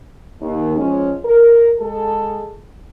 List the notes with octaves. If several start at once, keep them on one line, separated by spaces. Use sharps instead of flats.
D#2
F3 G#3 C#4
A#4
G#3 G#4 A4